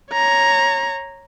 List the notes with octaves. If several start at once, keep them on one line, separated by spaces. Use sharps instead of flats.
C#5 A#5